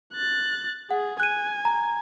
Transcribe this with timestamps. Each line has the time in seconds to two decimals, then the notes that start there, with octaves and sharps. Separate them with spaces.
0.13 F#6 A6
0.91 G#4 F#5
1.20 G#5 F#6 D#7
1.65 A#5